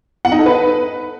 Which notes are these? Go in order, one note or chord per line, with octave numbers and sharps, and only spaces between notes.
F#5
D#4
A4
B4